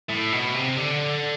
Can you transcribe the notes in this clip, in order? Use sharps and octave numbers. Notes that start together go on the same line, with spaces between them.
A2
B2
C3
D3